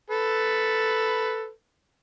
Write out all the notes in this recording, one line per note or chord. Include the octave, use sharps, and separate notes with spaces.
A4 B4